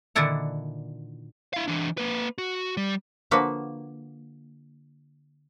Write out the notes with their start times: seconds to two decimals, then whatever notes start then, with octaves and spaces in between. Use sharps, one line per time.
0.16 A#2 D3 D#3 D4 E4 F#5
1.53 E4 F5
1.68 E3 D4
1.98 A#3 B4
2.38 F#4
2.77 G3
3.31 D3 F3 A#3 F#4 B4